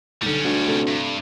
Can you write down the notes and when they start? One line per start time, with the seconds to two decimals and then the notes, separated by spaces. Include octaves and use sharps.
0.22 B1 D3 G3 C#4
0.45 D2
0.68 C3 A3
0.87 G2